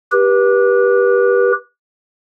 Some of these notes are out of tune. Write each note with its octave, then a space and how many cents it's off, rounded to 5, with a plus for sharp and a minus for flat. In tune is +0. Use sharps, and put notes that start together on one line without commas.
G4 +0 B4 -30